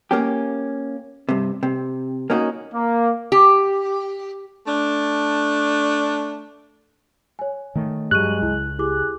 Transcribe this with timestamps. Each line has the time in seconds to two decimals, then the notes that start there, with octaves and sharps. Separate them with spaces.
0.11 A#3 C#4 G4
1.29 G2 C3
1.63 C3
2.30 A#3 C#4 D#4 F#4
2.74 A#3
3.32 G4
4.66 A3 D4
7.39 C#5 G#5
7.75 D#3 A3
8.11 G2 F#3 G#3 G4 C#6 F#6 D#7
8.42 C#2 E4
8.79 E4 G4 G#4 D6